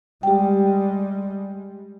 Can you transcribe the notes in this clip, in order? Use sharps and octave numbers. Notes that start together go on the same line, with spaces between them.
G3 G#3 G4 G5